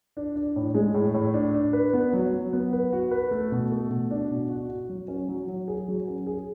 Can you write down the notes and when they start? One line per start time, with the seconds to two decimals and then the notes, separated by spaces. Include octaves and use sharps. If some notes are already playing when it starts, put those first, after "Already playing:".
0.17 D4
0.36 D4
0.56 A2
0.75 G#3
0.94 A2
1.14 A2
1.34 D4
1.54 D4
1.73 B4
1.93 B3
2.13 F#3
2.33 F#3
2.53 B3
2.73 B4
2.92 F#4
3.11 B4
3.31 A3
3.52 B2
3.71 A3
3.90 B2
4.11 D4
4.31 B2
4.49 F#4
4.69 F#4
4.89 F#3
5.08 C#4
5.28 F#3
5.48 F#3
5.68 G#4
5.88 F#3
6.08 C#4
6.26 G#4